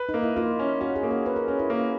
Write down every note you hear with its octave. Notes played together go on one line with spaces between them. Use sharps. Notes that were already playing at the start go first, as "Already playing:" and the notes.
Already playing: B4
D#4
A#3
E4
A#3 F4
C#4
C#4 F#4
G#4
A#3
G#4
C#4 B4
A#4
C#4 G#4
E4
A#3